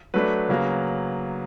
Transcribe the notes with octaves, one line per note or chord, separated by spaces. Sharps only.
F#3 A3 D4 B4
C#3 F#3 A#3